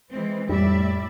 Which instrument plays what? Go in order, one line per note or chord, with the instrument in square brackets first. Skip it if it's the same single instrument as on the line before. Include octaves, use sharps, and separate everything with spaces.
[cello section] E3 G#3 C4
[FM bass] F2 [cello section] A2 D5 E5 [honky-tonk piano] G3